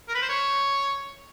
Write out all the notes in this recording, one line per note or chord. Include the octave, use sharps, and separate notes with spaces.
A#4
B4
C5
C#5